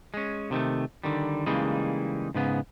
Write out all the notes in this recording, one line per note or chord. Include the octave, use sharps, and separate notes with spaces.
G#3 C#4
C3 D#3 G3 A3
D3 D#3 G3
C#3 E3 G3 G#3 A#3 D#4
G#2 C#3 B3